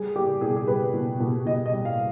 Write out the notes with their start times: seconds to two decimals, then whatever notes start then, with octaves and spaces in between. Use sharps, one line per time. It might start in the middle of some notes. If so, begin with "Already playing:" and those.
Already playing: G3 G#4
0.16 G3 G4
0.41 B2 G#4
0.56 G#4
0.67 G3 B4
0.94 B2
1.20 B2
1.46 B2 D#5
1.66 D#5
1.72 G3
1.85 F5